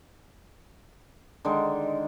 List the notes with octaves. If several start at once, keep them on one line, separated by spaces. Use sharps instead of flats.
D3 D#3 G#3